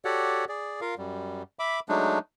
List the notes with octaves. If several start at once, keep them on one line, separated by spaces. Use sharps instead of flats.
F#4 G4 A4 C#5 D5 F#5
G#4 D5
F4 A#4 F5
F#2 G3
E5 B5 D6
F#3 G#3 A3 D4 D#4